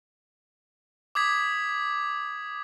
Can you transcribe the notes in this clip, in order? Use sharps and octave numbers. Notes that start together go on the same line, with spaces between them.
D6 D#6 G#6 B6